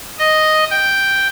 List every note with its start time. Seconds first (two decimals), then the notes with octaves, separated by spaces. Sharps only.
0.19 D#5
0.71 G5